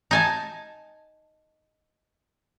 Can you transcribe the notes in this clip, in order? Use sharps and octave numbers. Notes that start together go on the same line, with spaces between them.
D#4 G#5 A5